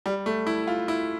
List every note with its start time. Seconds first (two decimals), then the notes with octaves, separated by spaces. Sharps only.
0.06 G3
0.26 A3
0.47 E4
0.67 F4
0.88 E4